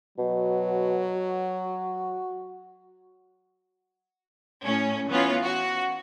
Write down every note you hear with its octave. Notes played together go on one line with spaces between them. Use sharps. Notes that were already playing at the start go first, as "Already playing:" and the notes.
B2 F#3
F#4
A2 C#4
E3 B3 C#4 F4
F#4